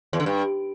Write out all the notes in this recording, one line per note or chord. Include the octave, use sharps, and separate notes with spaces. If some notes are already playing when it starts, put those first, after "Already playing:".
E2
D3
G2